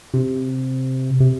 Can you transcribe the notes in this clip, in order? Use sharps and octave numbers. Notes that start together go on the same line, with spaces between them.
C3
C3